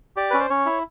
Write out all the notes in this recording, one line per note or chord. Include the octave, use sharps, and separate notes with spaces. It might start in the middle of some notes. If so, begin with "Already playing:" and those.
G4 D5
C#4 B4
C5
C#4 C#5
E4